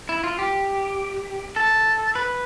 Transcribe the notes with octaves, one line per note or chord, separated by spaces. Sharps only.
E4
F4
G4
A4
B4